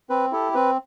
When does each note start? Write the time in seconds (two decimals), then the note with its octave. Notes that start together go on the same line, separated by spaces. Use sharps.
0.10 C4 B4
0.32 E4 G4 A4
0.55 C4 B4